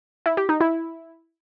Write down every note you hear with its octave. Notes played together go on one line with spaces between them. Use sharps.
E4
G4
D#4
E4